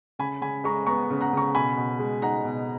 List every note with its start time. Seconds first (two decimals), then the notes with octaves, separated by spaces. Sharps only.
0.19 C#3 G#5 B5
0.41 C#3 G#5 B5
0.64 G#3 A#5 C#6
0.87 B3 A#5 C#6
1.10 C#3
1.21 F#5 A#5
1.33 C#3 A#5 C#6
1.55 B2 G#5 B5
1.77 B2
1.99 G#3
2.22 D#4 F#5 A#5
2.45 B2